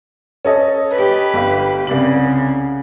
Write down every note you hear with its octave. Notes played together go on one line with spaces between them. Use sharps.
C#4 A4 D#5
G4 B4
G1 F5
C2 C#3 D5 F#7